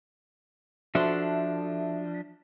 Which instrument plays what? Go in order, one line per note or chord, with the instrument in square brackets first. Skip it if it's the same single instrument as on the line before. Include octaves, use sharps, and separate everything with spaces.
[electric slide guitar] F3 D4 [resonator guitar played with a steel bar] F#4 A4 C5 [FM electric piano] E5